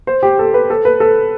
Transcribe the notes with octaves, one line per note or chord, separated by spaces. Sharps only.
C5
G4
A4
B4
A4
B4
A4